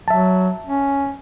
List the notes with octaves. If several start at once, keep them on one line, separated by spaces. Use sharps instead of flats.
F#3 E5 A5
C#4